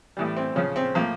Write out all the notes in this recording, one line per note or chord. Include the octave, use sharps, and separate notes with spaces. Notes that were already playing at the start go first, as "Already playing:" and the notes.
A2 E3 G3
C4
C#3 F3 C#4
C4
A2 F3 A#3